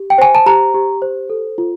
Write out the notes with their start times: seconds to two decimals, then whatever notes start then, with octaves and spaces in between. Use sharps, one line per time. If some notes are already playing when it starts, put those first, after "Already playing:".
Already playing: G4
0.10 G5
0.18 C5 G#5
0.35 A5
0.46 G4 A#5
0.74 G4
1.02 C5
1.30 A4
1.58 F4